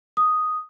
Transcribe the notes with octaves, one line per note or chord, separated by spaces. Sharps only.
D#6